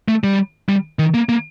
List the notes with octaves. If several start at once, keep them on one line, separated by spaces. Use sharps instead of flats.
A3
G3
G3
D#3
A#3
A#3